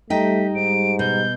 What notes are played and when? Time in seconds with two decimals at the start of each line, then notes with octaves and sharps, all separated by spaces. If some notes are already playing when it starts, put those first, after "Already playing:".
0.10 G3 A3 D#4 G4 G5 A#5 B6
0.55 G#2 D7
0.99 B2 G6